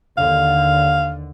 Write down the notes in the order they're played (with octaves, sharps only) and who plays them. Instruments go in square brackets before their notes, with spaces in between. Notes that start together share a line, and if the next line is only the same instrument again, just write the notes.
[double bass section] D#2 D3 [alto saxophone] F5